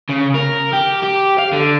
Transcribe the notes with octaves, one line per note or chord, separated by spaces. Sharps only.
C#3
A#4
G4
G4
F5
D3